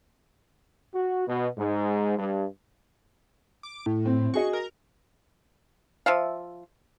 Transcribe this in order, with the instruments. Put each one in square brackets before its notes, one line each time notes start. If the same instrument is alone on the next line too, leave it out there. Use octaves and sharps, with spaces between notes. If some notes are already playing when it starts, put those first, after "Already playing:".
[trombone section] F#4
B2
G#2
G2
[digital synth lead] D6
A2
[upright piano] C4
[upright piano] F#4 G#4 D#5 [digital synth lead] C#6
[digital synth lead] A#4
[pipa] F3 E5 F5